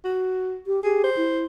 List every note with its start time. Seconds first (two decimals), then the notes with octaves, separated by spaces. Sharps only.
0.05 F#4
0.67 G4
0.83 G4 G#4
1.04 C5
1.16 E4